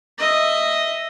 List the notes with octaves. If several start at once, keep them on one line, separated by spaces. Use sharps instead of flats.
D#5 E5